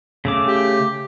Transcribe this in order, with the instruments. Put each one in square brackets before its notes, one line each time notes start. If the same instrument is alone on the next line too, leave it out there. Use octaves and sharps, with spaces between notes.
[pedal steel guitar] C#3 A3 D6
[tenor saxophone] G4